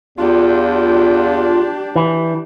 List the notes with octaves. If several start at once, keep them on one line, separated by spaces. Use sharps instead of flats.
E2 D4 F4 G4
E3